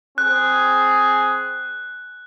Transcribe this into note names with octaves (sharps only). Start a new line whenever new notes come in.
C4 G#4 F#6